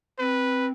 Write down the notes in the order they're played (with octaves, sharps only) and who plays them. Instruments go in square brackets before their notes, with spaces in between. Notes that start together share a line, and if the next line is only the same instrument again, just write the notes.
[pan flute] C4 [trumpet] B4